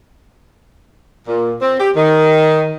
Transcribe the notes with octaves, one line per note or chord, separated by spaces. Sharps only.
A#2
C4
G4
D#3